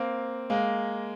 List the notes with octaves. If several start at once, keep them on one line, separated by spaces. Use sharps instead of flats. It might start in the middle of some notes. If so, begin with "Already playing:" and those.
Already playing: A#3 C4
G#3 A#3